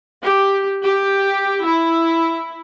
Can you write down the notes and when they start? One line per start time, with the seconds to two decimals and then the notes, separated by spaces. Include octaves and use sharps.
0.22 G4
0.86 G4
1.64 E4